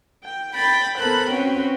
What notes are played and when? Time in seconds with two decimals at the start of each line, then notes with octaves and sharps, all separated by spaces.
0.24 G5
0.54 G5 B5 A6
0.97 B3 A4 A#4 C5 B5 F#6
1.30 C4 C#4 F#4 B4 C#5 G5